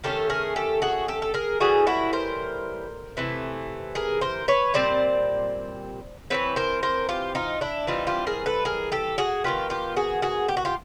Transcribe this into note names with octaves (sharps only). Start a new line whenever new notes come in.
D#3 F#3 A3 C#4 G4 A4
G#4 A#4
G4 A4
F#4 G#4
G4 A4
A4
G#4 A#4
A2 E3 G3 F#4 G#4
E4 F#4
A#4 C5
C3 E3 A3
G#4 A#4
A#4 C5
B4 C#5
A#2 G3 C4 C5 D5
E3 A3 C4 B4 C#5
A#4 C5
A#4 C5
F4 G4
D#4 F4
D4 E4
E3 G3 C4 D#4 F4
F4 G4
G#4 A#4
A4 B4
G#4 A#4
G4 A4
F#4 G#4
D#3 F#3 B3 F4 G4
F4 G4
F#4 G#4
F#4 G#4
G4
F#4
F4 G4